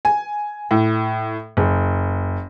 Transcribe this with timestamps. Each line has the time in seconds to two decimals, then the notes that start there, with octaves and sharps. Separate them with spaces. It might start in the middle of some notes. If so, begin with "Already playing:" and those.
0.05 G#5
0.71 A2
1.57 F#1